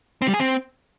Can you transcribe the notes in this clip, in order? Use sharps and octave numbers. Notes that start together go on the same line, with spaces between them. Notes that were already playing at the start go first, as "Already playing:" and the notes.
C4
G3
G#4
C4